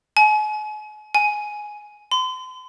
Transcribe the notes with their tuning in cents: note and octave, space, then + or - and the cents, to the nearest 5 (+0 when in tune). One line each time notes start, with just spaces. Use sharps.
G#5 +40
G#5 +5
C6 -40